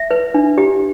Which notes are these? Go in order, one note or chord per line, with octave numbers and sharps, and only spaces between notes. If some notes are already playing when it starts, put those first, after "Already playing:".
Already playing: E5
B4
D4
G4